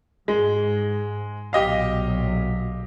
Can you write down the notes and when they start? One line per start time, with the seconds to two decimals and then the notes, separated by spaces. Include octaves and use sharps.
0.28 G#2 G#3
1.53 B1 A#2 F#3 G4 D#5 F5